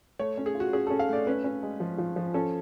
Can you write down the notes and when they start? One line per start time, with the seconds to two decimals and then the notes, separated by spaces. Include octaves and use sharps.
0.19 A3 C#5
0.38 C#4
0.46 G#4
0.55 F4
0.60 F#4
0.73 C#4 G#4
0.87 C#4 A4
0.99 F5
1.09 A3 D5
1.27 C#4 B4
1.44 C#4
1.63 G#3
1.80 F3
1.98 F3
2.16 F3
2.34 C#4 A4